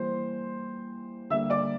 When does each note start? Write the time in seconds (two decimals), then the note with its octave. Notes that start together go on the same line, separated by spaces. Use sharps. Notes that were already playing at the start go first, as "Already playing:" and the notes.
Already playing: E3 G3 A#3 C5 C6
1.30 D3 G3 A#3 E5 E6
1.50 D5 D6